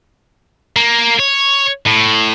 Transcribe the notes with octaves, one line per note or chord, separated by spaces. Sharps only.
A#3
C#5
A2